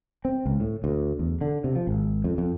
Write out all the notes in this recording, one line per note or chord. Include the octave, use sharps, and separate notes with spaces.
C4
C#2
A2
D2
E2
D3
C3
F3
G#1
F2
F2